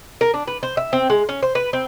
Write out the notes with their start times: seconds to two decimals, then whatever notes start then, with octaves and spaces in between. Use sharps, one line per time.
0.21 A#4
0.34 D4
0.48 B4
0.63 C5
0.77 E5
0.93 C4
1.10 G#3
1.29 C#4
1.43 C5
1.55 B4
1.73 C4